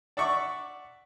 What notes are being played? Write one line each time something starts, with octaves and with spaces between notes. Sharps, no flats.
D5 E5 F#5 C#6 D6